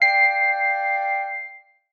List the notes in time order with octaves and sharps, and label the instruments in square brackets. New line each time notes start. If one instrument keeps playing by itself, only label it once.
[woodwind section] D5 F5 G5 [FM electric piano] C7